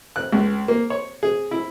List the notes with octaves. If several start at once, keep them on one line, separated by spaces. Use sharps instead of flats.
F#6
C#2
A#3
C#5
G#4
E4